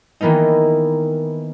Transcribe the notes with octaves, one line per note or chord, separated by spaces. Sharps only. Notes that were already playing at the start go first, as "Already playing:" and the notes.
D#3 E3 A#3 B3 D#4